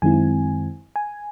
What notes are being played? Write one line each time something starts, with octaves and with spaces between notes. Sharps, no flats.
F#2 D#3 G#3 C4 E4 G#5
G#5